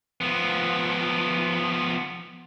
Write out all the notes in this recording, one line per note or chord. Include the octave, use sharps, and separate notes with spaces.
F3 B3